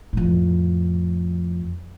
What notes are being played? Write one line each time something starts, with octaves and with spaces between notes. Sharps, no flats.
F2 A2